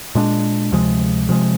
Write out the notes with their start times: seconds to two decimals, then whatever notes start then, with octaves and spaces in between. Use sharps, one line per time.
0.15 A#2 G#3 D4
0.72 D2 C3 F3 G#3
1.29 C3 F3 G#3